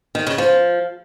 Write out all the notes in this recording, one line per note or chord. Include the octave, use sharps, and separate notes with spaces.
D#3
C#3
F3